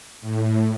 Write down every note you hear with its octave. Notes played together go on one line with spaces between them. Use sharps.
A2